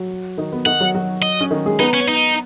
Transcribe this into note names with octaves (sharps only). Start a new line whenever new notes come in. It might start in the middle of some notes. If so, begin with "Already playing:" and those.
Already playing: F#3 F#4
D#3 D#4
B3
D#3 D#4 F#5
F#3 F#4
F#3 F#4
D#5
C#4
D#3 D#4
G#3 G#4
B3 D#4 B4
C#4
D#4